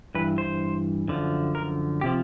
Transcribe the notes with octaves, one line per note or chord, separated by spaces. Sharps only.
G2 E3 B4
C5
F#2 D3 F3
A#4
C3 F3 G4